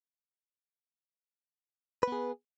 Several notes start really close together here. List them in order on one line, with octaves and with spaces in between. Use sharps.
B4 B3 G#4